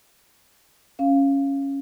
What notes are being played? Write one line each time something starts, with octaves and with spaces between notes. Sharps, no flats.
C#4 F5